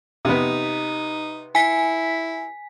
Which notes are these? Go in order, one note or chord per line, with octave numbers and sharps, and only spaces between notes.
C3 B3 D#4
E4 G#5 B6